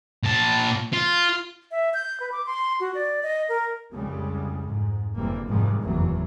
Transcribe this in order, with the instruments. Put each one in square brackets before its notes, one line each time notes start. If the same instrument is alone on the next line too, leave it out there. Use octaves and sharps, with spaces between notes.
[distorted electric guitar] A#2 A5
F4
[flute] E5
G6
B4
D6
C6
F#4
D5
D#5
A#4
[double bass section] C2 F2 C#3 G3 G#3
F2 G#2
F#1 D3 E3 G3 A#3 C4
G#2 C3 D#3 F3 G3 G#3
F#1 E2 A2 D#3 E3 F#3